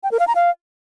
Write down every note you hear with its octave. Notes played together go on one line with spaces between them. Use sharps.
G5
A#4
F5
A#5
F5